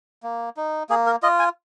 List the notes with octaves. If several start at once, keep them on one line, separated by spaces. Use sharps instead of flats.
A#3
D#4
A#3 G#4
A#4
F4 D#5
G#5